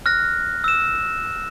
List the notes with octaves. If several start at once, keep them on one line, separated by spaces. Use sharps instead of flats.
F6 F#6 A#6
E6 E7